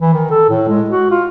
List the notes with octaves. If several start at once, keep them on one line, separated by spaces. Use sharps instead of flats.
E3
D#3
A4
A2
G#3
F#4
F4